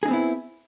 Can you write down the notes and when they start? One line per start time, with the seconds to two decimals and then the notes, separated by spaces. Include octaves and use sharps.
0.03 G#4
0.05 D#4
0.08 C4
0.11 B3
0.13 E4